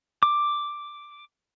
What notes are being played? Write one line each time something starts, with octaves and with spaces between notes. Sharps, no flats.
D6